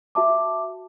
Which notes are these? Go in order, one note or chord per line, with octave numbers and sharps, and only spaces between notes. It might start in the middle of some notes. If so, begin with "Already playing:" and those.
F#4 E5 A5 D6